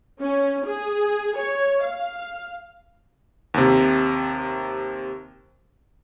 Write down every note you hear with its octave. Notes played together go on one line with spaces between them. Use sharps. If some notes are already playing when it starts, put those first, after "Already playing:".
C#4
G#4
C#5
F5
D#2 C3